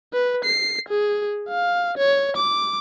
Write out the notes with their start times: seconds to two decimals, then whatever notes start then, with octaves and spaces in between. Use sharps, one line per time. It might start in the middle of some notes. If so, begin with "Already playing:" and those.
0.13 B4
0.44 C7
0.89 G#4
1.49 F5
1.97 C#5
2.37 D6